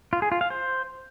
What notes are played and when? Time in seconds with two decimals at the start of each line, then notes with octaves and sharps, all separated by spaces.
0.13 F4
0.22 G#4
0.32 F4
0.41 F5
0.50 C5